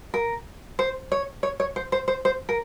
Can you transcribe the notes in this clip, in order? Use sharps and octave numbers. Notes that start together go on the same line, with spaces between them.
A#4
C5
C#5
C#5
C#5
C5
C5
C5
C5
A#4